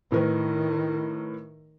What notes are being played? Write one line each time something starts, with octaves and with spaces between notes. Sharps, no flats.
A2 D#3 A#4 B4